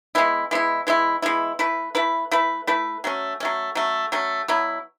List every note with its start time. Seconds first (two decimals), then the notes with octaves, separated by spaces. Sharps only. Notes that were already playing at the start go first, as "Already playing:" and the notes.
0.15 E3 G#3 B3 E4
0.51 E3 G#3 B3 E4
0.87 E3 G#3 B3 E4
1.22 E3 G#3 B3 E4
1.59 A3 E4 B4
1.95 A3 E4 B4
2.31 A3 E4 B4
2.67 A3 E4 B4
3.04 F#3 A3 C#4
3.40 F#3 A3 C#4
3.75 F#3 A3 C#4
4.12 F#3 A3 C#4
4.48 B2 F#3 B3 E4